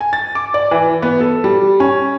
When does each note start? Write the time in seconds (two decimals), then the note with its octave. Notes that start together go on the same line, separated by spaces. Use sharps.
0.01 G#5
0.13 A6
0.35 D6
0.54 D5
0.71 E3
1.02 B3
1.20 A4
1.44 G3
1.80 C#4